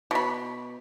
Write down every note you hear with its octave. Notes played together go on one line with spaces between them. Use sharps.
B2 B5